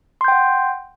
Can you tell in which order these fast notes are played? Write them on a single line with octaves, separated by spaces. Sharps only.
C6 G6 G5 F#5